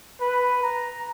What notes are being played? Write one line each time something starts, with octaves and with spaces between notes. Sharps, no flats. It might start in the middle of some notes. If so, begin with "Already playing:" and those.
B4
A#5